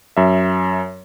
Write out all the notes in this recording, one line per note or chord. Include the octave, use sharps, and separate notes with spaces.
F#2 E5